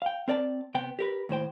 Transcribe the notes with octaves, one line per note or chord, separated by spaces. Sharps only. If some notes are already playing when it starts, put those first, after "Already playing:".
F5 G5
C4 A#4 D5 G5 A5
C3 B3 G5
G4 A#4 B4
D#2 A2 C5 G5